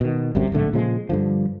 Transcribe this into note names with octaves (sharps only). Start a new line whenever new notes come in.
B2 D#3
G1 C2 F#2 C3
D1 A#1 D3 A3
A#2 C#3 F3 G#3
G2 D3 F3